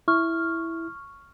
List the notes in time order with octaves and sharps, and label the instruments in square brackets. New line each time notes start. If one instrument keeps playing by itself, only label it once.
[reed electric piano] E4 [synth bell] C#6 F6